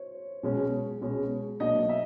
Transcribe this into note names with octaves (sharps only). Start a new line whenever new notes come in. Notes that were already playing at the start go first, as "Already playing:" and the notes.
Already playing: C5 C#5
B2 G#3 C#4
B2 G#3 C#4
B2 F#3 A#3 D4 D#5
E5